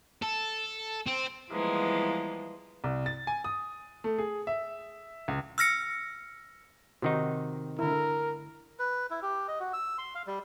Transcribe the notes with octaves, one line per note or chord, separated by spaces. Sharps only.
A4
C4
E3 F3 G3 G#3 A#3 B3
C2
A6
G#5
D#6
A3
G#4
E5
C#2
E6 F6 A#6 C#7
C3 D#3 D#4 F#4
D3 E4 A#4
B4
E4
G4
D#5
F#4
E6
C6
F5
G3